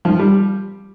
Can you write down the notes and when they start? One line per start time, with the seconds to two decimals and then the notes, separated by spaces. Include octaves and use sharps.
0.05 F3
0.19 G3